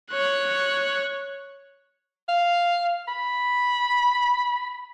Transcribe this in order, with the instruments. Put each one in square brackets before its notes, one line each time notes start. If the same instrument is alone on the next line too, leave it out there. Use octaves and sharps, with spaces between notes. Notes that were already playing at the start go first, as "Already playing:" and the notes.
[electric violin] C#5 F#6
[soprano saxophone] F5
B5